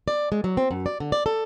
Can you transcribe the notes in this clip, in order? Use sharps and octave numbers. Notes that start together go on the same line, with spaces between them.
D5
G#3
F#3
C4
F#2
D5
D3
D5
A4